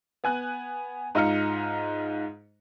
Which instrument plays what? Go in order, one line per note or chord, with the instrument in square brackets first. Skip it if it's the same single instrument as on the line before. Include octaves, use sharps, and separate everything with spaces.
[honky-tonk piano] B3 G#5 F#6
G#2 D#4 F4 A#5 F6 C#7